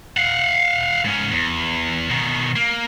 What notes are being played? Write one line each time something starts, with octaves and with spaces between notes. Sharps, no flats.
F5 F#5
G#2 C#4
E2
B2 D#3
A#3